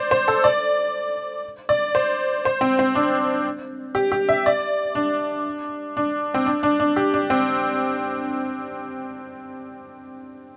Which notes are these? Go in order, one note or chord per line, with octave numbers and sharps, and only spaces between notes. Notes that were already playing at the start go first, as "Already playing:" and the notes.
Already playing: C5 D5
C5
A4
D5
D5
C5
C5
C4
C4
D4
G4
G4
E5
D5
D4
D4
C4
D4
D4
D4
G4
D4
C4